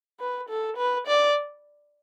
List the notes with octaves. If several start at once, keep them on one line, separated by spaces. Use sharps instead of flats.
B4
A4
B4
D5